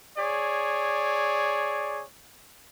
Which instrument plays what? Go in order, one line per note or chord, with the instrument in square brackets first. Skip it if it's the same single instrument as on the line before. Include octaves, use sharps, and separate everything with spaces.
[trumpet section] G#4 C#5 D5